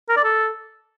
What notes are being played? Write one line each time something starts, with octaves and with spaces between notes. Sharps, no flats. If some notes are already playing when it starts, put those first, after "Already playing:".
A#4
D5
A4